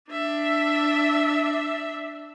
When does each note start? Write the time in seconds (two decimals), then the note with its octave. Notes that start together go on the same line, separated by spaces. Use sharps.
0.10 D4 E5